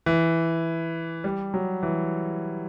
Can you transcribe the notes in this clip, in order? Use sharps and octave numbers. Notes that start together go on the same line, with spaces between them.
E3
G3
F#3
E3